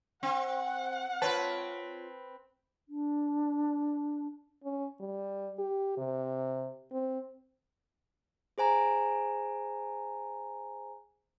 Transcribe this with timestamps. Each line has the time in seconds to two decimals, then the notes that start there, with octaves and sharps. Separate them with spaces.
0.23 C4 F#5
1.22 C4 F4 B4 C#5 A5
2.88 D4
4.64 C#4
5.00 G3
5.59 G4
5.97 C3
6.92 C4
8.58 G#4 C5 G#5 A#5